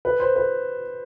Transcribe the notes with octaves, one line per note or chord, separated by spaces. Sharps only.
B4
C5
B4